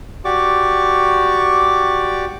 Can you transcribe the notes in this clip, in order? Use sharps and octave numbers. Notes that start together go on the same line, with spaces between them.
F#4 G4 D5 C#6 D6